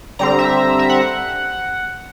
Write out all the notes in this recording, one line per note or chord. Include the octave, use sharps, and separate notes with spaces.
D3 G3 C4 A#5
E5
E5
F#5